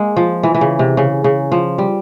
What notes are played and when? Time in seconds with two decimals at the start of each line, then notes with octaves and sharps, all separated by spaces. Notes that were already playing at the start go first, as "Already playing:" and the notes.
Already playing: G#3 A#3
0.16 F3
0.43 E3
0.55 E3
0.61 C#3
0.79 C3
0.97 C#3
1.24 C#3
1.52 F3
1.78 G3